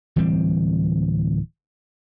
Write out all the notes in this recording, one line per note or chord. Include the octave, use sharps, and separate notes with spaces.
D1 E3 G3 C4